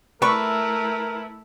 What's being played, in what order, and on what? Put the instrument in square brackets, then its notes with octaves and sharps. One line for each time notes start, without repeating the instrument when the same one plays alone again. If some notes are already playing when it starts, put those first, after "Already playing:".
[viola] A3 E4 [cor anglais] A#4 [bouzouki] B4 [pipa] D5 C#6